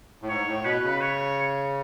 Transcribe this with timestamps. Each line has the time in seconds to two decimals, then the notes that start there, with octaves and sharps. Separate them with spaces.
0.22 A2
0.29 G#2 C#5
0.47 A2
0.65 B2 B4
0.83 C#3
1.01 C#5